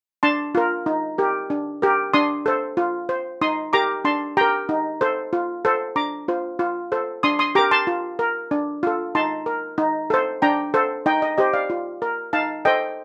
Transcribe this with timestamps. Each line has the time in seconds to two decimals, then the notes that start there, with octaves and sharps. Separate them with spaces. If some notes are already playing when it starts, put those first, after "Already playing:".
0.23 D4 A5 C6
0.55 F4 A#4
0.86 D#4
1.18 G4 A#4
1.50 D4
1.82 G4 A#4
2.14 D4 C6 D#6
2.46 A4 C5
2.77 F4
3.09 C5
3.41 D#4 C6 D#6
3.73 G4 A#4 A#5 D6
4.05 D4 A5 C6
4.37 G4 A#4 G5 A#5
4.69 D#4
5.01 A4 C5
5.33 F4
5.65 A4 C5
5.96 D4 A#5 D6
6.28 F4 C5
6.59 F4
6.92 A4 C5
7.23 D4 C6 D#6
7.39 C6 D#6
7.55 G4 A#4 A#5 D6
7.71 A5 C6
7.87 F4
8.19 A#4
8.51 D4
8.83 F4 A4
9.15 D#4 A5 C6
9.46 A#4
9.78 D#4
10.10 A4 C5
10.42 D4 G5 A#5
10.74 A4 C5
11.06 D#4 D#5 G5
11.22 D#5
11.38 G4 C5 D#5
11.53 D5 F5
11.70 F4
12.02 A#4
12.33 D#4 F5 A5
12.65 A4 C5 D#5 G5